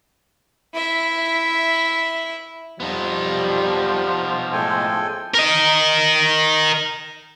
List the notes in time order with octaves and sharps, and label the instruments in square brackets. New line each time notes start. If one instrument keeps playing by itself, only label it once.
[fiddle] E4 E5
[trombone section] F2 G3 [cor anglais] F3 [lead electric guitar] B3 D#4
[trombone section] A2 G#3 A3 [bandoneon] A4 G5 G#5
[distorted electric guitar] A#4 D#5